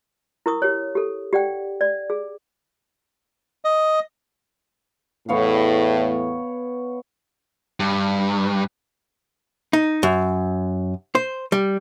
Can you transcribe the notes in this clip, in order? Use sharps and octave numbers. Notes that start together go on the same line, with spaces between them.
E4 A#4 C#6 D#6
G4 C#5
G4 A4
G4 D5 F#5 G5
D5
G#4
D#5
E2 A2 B3 C#5 F5
G2
D#4
F#2
C5
G3